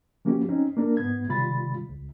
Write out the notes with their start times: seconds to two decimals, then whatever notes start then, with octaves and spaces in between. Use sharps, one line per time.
0.25 F3 A#3 C#4 F#4 G4
0.49 C4 C#4 D#4
0.77 A#3 D4 A#4
0.97 G#2 B3 G#6
1.28 C3 D#3 G3 F4 B5 A6
1.89 C#2